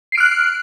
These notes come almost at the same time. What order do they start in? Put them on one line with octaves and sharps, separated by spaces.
C7 D7 F6 F#6